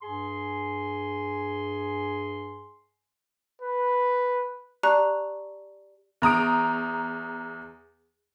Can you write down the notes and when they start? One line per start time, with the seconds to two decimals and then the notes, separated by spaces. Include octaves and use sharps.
0.03 G2 G#4 G#5 C6
3.62 B4
4.83 G4 D5 A5 A#5 C#6 F#6
6.22 E2 A#5 D#6 D7